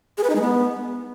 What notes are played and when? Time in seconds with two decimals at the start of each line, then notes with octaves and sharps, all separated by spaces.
0.18 G#4
0.24 B4
0.30 D#4
0.35 G#3
0.41 B3